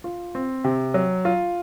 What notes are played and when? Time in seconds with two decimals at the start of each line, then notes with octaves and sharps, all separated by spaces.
0.04 F4
0.35 C4
0.64 C3
0.94 F#3
1.25 F4